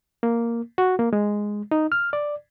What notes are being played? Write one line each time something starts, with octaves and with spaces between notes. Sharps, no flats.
A#3
F#4
A#3
G#3
D#4
F6
D5